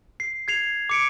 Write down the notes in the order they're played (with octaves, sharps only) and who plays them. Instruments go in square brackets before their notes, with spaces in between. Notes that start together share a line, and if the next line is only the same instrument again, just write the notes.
[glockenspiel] C7
G#6 C7 F7
D6 C#7 D7